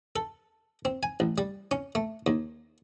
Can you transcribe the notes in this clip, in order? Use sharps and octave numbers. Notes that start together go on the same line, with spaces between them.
A4
C4
G#5
A1
G3
C#4
A3
D#2